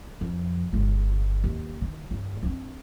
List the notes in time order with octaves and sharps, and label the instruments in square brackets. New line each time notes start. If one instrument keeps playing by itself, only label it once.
[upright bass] F2
G1 G#3
D#2
D#3
G2
C4 D4